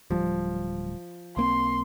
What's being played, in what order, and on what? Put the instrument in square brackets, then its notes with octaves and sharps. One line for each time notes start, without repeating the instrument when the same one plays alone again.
[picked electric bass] D1 G3 [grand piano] F3
[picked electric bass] B1 A#3 C4 [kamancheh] C6